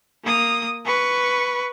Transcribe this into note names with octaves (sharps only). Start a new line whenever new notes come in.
A#3 D#6
B4 C#6